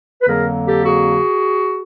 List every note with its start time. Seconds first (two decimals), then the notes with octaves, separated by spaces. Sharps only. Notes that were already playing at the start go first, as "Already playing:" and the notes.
0.21 B4
0.25 F2 D3 F#3 A#3 G#4 A#4
0.65 G4 A4
0.84 F#4 G#4